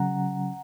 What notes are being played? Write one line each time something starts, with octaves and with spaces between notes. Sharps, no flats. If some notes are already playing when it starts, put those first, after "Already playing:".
Already playing: C#3 F#3 C#4 F#5 A#5